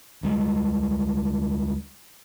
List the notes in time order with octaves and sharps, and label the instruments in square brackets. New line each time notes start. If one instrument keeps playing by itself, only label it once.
[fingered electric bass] D2 G3 G#3